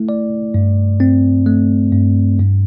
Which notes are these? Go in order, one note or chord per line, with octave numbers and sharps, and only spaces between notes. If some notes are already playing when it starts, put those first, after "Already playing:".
Already playing: A3 E4
D5
G2
C4
A3
G2
G2